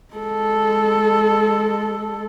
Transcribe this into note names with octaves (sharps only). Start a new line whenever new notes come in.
G#3 A4